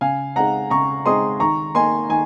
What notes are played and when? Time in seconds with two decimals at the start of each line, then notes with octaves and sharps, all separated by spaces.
0.01 C#3 F5 G#5
0.36 G#3 C4 D#4 G#4 F#5 A#5
0.70 C#3 A#5 C#6
1.06 G#3 C4 D#4 G#4 C6 D#6
1.40 D#3 A#5 C#6
1.75 A#3 D#4 G#5 C6
2.09 D#3 G#5